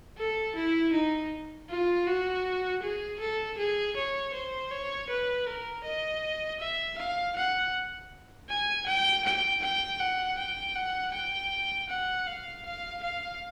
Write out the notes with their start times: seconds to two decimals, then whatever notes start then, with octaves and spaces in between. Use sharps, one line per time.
0.18 A4
0.56 E4
0.93 D#4
1.69 F4
2.06 F#4
2.82 G#4
3.20 A4
3.58 G#4
3.96 C#5
4.34 C5
4.71 C#5
5.10 B4
5.47 A#4
5.85 D#5
6.60 E5
6.98 F5
7.36 F#5
8.49 G#5
8.87 G5
9.25 G5
9.63 G5
10.00 F#5
10.38 G5
10.76 F#5
11.14 G5
11.90 F#5
12.27 F5
12.65 F5
13.03 F5